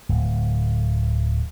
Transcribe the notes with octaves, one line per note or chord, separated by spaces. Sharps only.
D1